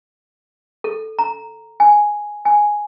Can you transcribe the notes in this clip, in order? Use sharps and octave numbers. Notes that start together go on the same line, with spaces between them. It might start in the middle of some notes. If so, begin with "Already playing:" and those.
A4
A#5
G#5
G#5